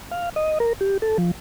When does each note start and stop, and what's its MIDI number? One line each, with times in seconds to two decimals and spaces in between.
0.11 0.29 77
0.36 0.58 75
0.60 0.73 70
0.81 0.97 67
1.02 1.17 69
1.18 1.31 53